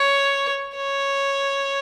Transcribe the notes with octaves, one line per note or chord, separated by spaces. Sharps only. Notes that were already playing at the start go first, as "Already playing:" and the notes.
Already playing: C#5
C#5